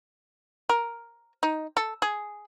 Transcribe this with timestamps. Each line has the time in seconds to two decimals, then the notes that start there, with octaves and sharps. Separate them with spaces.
0.69 A#4
1.43 D#4
1.77 A4
2.02 G#4